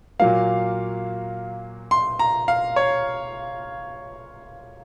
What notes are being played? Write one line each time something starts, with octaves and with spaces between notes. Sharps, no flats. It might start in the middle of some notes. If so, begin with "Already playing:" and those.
A#2 F#3 A#3 F5
C6
A#5
F5
C#5